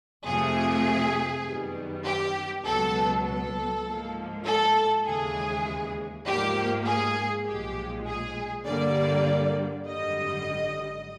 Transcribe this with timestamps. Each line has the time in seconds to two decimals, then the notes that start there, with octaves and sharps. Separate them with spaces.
0.25 F2 C3 F3 A3 G#4
1.45 F#2 D#3 G3 B3
2.05 G4
2.65 C#2 B2 F#3 B3 A4
3.26 A4
3.86 G#2 F3 A#3
4.46 A4
5.06 D#2 C#3 E3 G#3 G#4
6.26 G#2 F3 A#3 G4
6.86 G#4
7.47 B1 A#2 F3 G#3 G4
8.07 G#4
8.66 G2 D3 G3 A#3 D5
9.87 G#1 F#2 D3 G3 D#5